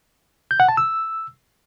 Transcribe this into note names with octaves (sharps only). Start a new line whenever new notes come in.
G6
F#5
A5
E6